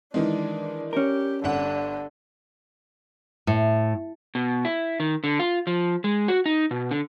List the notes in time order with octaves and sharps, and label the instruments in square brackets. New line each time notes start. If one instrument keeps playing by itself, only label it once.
[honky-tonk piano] D#3 E3 G#3 [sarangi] D4
[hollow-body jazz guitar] C#4 A#4 [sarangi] G4
[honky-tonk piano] G1 F#5 [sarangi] D3
[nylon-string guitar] A2
[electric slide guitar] B2
E4
D#3
D3
F4
F3
G#3
F#4
D#4
B2
D3